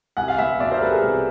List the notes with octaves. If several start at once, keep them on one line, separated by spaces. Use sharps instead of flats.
C2 F#5 G#5
F5
B3 E5 F#5
B2 D5 E5
A#4 C5
G3 A4 B4
G#4 A#4
C2